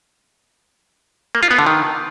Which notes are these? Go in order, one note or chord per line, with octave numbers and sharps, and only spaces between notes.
A#3
F4
B3
D3
D#3